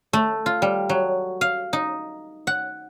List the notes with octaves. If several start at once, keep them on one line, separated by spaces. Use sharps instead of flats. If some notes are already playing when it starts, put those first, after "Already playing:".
A3
F4
G3
F#3
F5
D#4
F#5